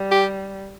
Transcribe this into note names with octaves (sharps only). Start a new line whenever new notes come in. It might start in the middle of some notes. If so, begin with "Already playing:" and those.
Already playing: G3
G4